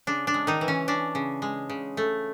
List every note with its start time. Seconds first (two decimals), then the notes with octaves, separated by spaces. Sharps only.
0.07 C#3 D4
0.27 D4
0.34 G#3
0.47 D#3 D#4
0.61 E3
0.68 C#4
0.88 C#4 D4
1.15 C#3
1.42 G#3
1.69 C#3
1.97 A3